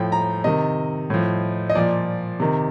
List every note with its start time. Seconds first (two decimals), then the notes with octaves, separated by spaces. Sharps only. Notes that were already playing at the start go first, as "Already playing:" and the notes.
Already playing: A2 F3 G5
0.12 A#5
0.44 C3 D#3 D#5
1.10 A2 F3
1.70 D#5
1.75 A#2 F3 D5
2.40 C3 D#3